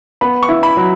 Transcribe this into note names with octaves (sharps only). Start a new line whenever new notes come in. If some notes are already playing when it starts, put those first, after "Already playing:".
B3 B5
C#6
E4
B5
F#3